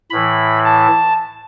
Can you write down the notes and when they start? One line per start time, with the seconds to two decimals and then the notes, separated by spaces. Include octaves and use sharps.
0.10 A2 E3 B5
0.65 A5